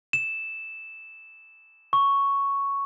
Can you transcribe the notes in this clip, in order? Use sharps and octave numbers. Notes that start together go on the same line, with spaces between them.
E7
C#6